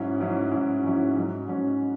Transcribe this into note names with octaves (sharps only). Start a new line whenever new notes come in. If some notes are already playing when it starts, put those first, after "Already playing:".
Already playing: G#2 F#3 C#4 E4
G#2 F#3 C#4 E4
G#2 F#3 C#4 E4
G#2 F#3 C#4 E4
G#2 F#3 C#4
G#2 F#3 C#4